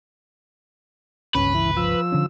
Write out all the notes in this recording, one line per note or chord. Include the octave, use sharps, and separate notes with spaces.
G1 C#2 C#4 B4
E3
F3 E6
D3 C#4